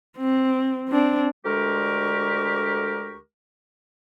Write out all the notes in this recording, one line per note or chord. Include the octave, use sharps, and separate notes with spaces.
C4
C4 D4
D2 D3 G#3 G4 A#4 C#6